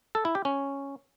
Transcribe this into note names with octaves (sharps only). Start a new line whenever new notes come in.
A4
E4
G4
C#4